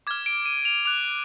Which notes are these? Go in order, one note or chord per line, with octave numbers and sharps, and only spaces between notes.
D6 F6 G#6
D7
D#7
F7
D6 F#6 F7